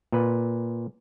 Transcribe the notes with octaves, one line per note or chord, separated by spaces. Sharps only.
A#2 B4